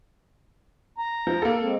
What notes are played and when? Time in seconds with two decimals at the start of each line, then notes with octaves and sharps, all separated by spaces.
0.98 A#5
1.27 F3
1.42 A#3 A4
1.61 G#3 C4